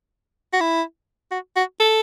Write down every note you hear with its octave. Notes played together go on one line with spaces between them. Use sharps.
F#4
E4
F#4
F#4
A4